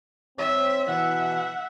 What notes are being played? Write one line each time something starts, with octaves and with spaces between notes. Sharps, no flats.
C4 C#5 E5
B2 E3 E5 F#5